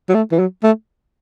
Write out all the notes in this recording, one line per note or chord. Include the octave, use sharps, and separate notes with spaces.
F#3
A3
E3
F#3
A3